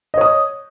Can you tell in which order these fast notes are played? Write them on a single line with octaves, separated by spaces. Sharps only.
D#5 C#5 D#6